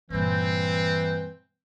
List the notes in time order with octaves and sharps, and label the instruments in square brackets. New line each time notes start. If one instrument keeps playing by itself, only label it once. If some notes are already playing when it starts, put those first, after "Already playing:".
[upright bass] G2 A#2 [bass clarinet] E3 [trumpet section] C4